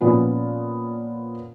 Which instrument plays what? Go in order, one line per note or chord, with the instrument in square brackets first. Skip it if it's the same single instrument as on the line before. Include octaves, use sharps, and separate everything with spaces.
[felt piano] A#2 F3 B3 C#4 F4